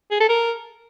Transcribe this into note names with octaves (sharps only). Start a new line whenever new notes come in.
G#4
A4
A#4